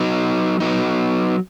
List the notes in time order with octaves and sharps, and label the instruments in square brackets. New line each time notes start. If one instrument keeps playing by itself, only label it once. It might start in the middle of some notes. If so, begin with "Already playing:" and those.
Already playing: [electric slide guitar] F#3 B3 D#4
F#3 B3 D#4